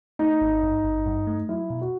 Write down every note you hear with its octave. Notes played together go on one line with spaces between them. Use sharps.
A3 D#4
G#1
G2
G#1
G2
A3
F#3 E4
B2
F#4